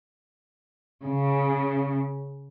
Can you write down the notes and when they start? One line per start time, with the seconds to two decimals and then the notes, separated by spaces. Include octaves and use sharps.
1.02 C#3